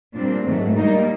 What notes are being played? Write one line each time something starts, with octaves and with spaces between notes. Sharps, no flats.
A#2 G3 C4 D4
G#2 D#3 F#3 A3
A#2 G3 A#3 D#4